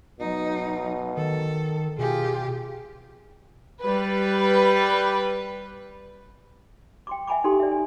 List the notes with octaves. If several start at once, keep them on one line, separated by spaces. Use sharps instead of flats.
B2 F#3 D#4
D#3 A4
B2 F4 G4 G#4
G3 B4
G5 C6 D6
E5 F#5 G#5 A#5 B5 D6
D#4 G4 A4 G5 G#5 C6
D5 E5
G#5